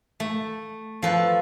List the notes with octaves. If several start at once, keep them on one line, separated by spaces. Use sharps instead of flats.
A3
F3 A4 B4